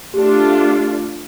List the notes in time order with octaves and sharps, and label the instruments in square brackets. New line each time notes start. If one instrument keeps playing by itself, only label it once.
[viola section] A3 D4 F4 [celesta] G4